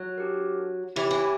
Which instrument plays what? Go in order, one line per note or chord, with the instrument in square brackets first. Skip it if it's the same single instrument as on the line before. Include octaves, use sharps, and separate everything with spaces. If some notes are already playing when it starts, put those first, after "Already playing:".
Already playing: [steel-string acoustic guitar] F#3
[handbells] D4 G4 A#4
[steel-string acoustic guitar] E3 [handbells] E4 G4 C#5
[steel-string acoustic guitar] E3